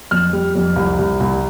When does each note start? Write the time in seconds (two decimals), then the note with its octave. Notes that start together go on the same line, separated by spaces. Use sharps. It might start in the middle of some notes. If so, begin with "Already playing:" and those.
0.11 F2 F6
0.33 G3
0.55 F2
0.76 C2
0.98 C2
1.20 C2